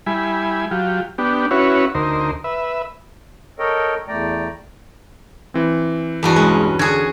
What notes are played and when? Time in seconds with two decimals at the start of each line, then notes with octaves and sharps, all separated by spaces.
0.06 G3 E4 G#5 B5
0.71 F#3 F4 G4
1.18 B3 D4 G4
1.51 C#4 E4 F#4 B4 C#5
1.95 D2 D#4 A#4 C5
2.44 B4 E5
3.59 A4 A#4 C#5 D#5 G5
4.08 E2 A3 D5 G5 A#5
5.54 E3 C4
6.23 E2 G2 F#4
6.36 B1 G#3 C#4
6.79 D3 F#4 G#4 G#6